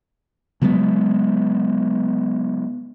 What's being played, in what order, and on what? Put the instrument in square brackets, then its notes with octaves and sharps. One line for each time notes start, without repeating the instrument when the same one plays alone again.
[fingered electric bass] C#3 F#3 G#3 B3